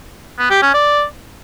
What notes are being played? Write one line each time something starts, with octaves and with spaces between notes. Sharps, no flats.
B3
G4
C#4
D5